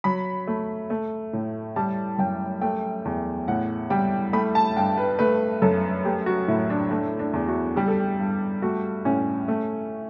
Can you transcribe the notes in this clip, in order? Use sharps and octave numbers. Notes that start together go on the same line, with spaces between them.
F#3 B5
A3
A3
A2
G3 A5
F#2 G5
A3 G5
E2
A2 F#5
G3 G5
A3 B5
A5
G2 G5
B4
A3 B4
F#2 A4
A3 G4
F#4
A2 E4
D4
A3 D4
D4
E2
F#4
G3 G4
A4
G4
G2
A3 F#4
A2 C#4
A3